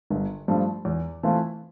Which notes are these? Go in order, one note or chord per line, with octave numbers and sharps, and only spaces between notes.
G1
G2 F3 A3
E2
E3 A3 C4 F4